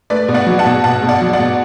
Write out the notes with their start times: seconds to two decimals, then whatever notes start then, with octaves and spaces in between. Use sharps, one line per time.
0.10 A3 B4 D5
0.28 B2
0.34 D5 F#5
0.46 F#3
0.59 F#5 A5
0.66 B2
0.84 B2 F#5 A5
1.03 B2
1.09 D5 F#5
1.21 F#3
1.33 D5 F#5
1.39 B2